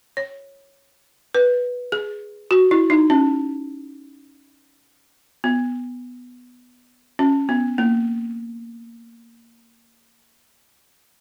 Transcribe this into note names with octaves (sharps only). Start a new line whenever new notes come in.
C#5
B4
G#4
F#4
E4
D#4
C#4
B3
C#4
B3
A#3